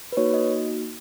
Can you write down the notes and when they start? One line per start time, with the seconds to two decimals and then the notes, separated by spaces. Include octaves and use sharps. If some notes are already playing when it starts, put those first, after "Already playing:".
0.12 B4
0.17 A#3 D#4 F#4 C#5
0.34 D#5